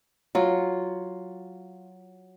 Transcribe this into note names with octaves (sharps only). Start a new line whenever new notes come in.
F#3 F4